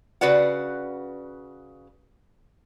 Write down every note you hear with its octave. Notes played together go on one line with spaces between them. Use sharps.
C#3 F#4 B4 D5 F#5